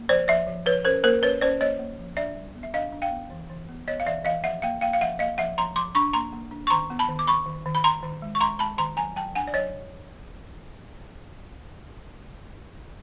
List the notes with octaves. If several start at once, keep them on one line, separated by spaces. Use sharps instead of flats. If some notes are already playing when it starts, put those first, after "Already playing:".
Already playing: A#3
F3 C5 D5
F3 D5 E5
F3
F3 B4 C#5
C#4 A#4 C5
A#3 A#4 C5
C#4 B4 C#5
C#4 C5 D5
A#3 C#5 D#5
A#3
F3
D4 D5 E5
G3
B3
E5
D4 D#5 F5
D4
F5 G5
B3
E3
E3
B3
B3 C#5 D#5
F5
E3 D5 E5
E3 D#5 F5
F3 E5 F#5
A#3 F5 G5
A#3 F5 G5
F5
F3 E5 F#5
A#3 D#5 F5
F3 E5 F#5
F3 A#5 C6
F3 C6 D6
D4 B5 C#6
A#3 A#5 C6
A#3
D4
C#6
D#3 A#5 C6
B3
A5 B5
D#3
D6
D#3 B5 C#6
D#3
D#3
B5
D#3 A#5 C6
D#3
G#3
C#6
G#3 A#5 C6
G#3 A5 B5
D#3 A#5 C6
F#3 G#5 A#5
F#3 G5 A5
D4 F#5 G#5
D5
F#3 C#5 D#5